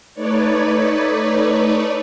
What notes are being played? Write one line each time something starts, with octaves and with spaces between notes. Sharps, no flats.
A3 D#4 B4 C#5 D5